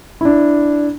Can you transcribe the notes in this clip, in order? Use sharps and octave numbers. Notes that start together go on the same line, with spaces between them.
D4 E4